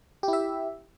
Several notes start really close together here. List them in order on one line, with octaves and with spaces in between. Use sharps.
G4 E4 E5